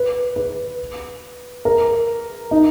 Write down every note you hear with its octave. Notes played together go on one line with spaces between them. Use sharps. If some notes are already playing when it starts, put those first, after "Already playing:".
Already playing: B4
B4
A#4
D#4